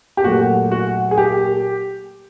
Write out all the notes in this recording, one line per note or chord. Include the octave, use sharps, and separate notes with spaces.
G4
A#2 F#3 A3 F#4
F#4
G#4
G4